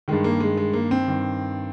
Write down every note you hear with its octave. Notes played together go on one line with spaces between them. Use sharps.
G2 D#3 G#3
A#3
G#3
G#3
A#3
C4
G2 D#3